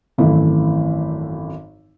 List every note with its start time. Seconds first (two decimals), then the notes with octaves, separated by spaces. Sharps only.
0.18 G#1 F#2 E3 A3 E4